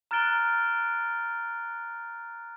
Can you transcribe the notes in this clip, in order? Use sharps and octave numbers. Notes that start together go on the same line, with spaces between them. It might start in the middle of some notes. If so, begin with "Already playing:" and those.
A#5 F6 F#6 A6 D7 G7